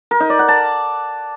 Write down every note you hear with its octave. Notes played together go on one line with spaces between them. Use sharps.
A#4
D#4
D5
F#5
A5